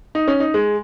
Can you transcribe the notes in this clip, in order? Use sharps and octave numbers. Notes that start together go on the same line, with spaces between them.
D#4
C#4
D#4
G#3